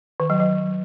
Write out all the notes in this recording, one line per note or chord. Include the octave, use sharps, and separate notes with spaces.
D#3
F#3
F#3